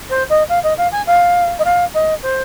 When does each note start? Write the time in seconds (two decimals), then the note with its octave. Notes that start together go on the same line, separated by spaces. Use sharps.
0.10 C5
0.29 D#5
0.49 F5
0.63 D#5
0.77 F5
0.92 G#5
1.07 F5
1.59 D#5
1.64 F5
1.94 D#5
2.22 C5